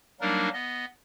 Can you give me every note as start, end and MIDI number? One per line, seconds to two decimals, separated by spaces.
0.21 0.49 54
0.21 0.49 55
0.21 0.49 58
0.21 0.49 62
0.21 0.49 63
0.21 0.49 70
0.53 0.85 59
0.53 0.85 75